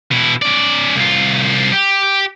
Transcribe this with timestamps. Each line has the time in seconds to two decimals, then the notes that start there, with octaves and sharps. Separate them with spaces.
0.12 B2 E4
0.42 C#4 D5
0.95 C2 F4
1.72 G4